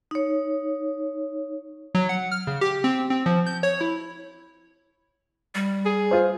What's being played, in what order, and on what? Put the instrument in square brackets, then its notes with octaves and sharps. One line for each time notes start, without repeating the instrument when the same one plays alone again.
[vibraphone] D#4 C#5
[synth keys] F#3
F#5
F6
C#3
G4
C4
C4
F3
G6
C#5
E4
[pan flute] G3
[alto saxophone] G#4
[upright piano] F4 C5